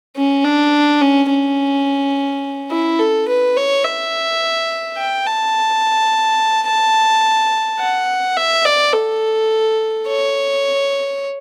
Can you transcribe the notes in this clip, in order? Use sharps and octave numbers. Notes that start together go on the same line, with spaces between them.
C#4
D4
C#4
C#4
E4
A4
B4
C#5
E5
G5
A5
A5
F#5
E5
D5
A4
C#5